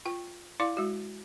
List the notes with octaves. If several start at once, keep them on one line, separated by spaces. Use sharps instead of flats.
F4 G5
E4 D5 F5 D6
G#3 F#4